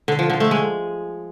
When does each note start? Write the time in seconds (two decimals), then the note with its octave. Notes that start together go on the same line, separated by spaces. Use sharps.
0.08 D3
0.19 F3
0.30 D3
0.40 A3
0.51 G#3